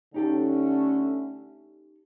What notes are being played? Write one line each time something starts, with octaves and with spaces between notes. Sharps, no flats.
D3 A3 C#4 D#4 G4 A4